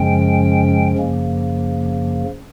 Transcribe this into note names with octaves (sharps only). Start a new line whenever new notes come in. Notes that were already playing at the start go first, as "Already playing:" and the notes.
Already playing: F#2 C#3 F3 G#3 C#4 G5
F#2 C#3 F3 A#3